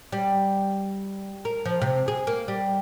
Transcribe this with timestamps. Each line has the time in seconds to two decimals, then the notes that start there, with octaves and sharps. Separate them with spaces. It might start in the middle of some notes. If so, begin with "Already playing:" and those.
0.12 G3
1.45 A#4
1.65 F3
1.82 C3
2.08 G#4
2.27 A#3
2.48 G3